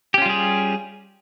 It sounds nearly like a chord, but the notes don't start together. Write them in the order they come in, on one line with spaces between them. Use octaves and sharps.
G4 C#4 F4 G3 G#4